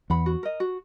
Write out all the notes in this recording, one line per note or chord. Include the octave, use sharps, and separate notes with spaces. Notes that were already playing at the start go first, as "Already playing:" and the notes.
E2 F#5 B5
F#4
A#4 D#5
F#4